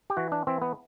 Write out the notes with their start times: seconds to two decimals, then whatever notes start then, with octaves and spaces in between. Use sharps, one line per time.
0.10 G4
0.17 E3 F#4
0.32 D4
0.47 E3 C4
0.62 B3